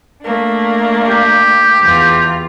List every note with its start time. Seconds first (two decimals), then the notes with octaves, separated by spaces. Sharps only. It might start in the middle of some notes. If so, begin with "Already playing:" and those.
0.22 A3 A#3 D4
1.09 G4
1.81 E2 F4